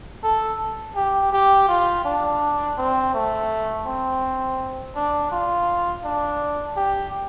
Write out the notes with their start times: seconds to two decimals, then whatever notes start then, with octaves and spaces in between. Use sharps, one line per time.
0.24 A4
0.96 G4
1.33 G4
1.69 F4
2.05 D4
2.78 C4
3.14 A3
3.86 C4
4.96 D4
5.32 F4
6.04 D4
6.77 G4